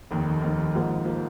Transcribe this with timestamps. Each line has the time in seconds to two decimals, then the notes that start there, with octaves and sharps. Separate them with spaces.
0.11 F1 D#2 D#3
0.42 F1 D#2 D#3
0.74 G#1 G#2 F3 A#3
1.05 F3 A#3